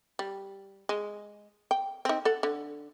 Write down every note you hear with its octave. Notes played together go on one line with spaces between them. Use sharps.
G3
G#3
G5
C4 D#4
A4 F#5
D3